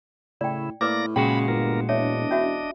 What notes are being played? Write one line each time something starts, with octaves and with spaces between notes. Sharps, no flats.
A2 C#3 E4 D5 G5
A2 A#3 A#4 B4 D5 D6 A#6
A#2 C#3 G#3 F#4 G5 B5
G1 A#3 A#4
E1 D4 C#5 D#5 E5
C#4 F#4 E5